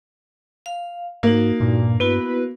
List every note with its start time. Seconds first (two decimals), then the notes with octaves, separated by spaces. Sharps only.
0.66 F5
1.23 G#2 A#3 D#4 F#4
1.60 G2 A#2
2.00 B3 E4 F#4 B4